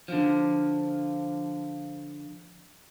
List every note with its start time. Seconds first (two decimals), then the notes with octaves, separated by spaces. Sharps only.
0.08 D3 F3